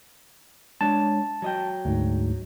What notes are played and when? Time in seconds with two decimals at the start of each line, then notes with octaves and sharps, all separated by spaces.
0.81 G#3 D4 C#5 A5
1.42 F#3 D#5 G5
1.85 D2 G#2